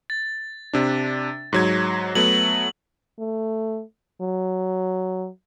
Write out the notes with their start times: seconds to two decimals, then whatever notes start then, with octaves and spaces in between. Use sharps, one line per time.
0.10 A6
0.73 C3 D4
1.53 G#2 F#3 G#6
2.15 F#3 A3 B3 F#7
3.19 A3
4.21 F#3